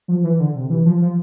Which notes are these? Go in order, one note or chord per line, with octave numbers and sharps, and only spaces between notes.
F3
E3
D3
C3
E3
F3
F3